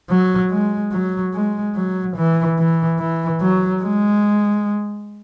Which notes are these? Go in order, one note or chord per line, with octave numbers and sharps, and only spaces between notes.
F#3
G#3
F#3
G#3
F#3
E3
E3
E3
F#3
G#3